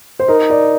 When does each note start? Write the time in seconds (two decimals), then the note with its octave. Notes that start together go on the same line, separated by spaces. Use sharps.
0.19 C5
0.28 D#4 A#4
0.50 D5